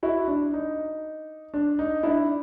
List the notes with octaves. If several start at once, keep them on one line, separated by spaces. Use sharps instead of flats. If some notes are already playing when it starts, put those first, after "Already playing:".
E4 F#4
D4
D#4
D4
D#4
D4 E4